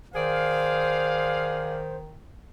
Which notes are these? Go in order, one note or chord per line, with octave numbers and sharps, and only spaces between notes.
D#3 G#4 C5 D5 F5